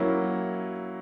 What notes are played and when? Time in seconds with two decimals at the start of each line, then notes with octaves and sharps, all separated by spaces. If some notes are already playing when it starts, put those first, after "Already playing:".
Already playing: F#3 A#3 C#4 E4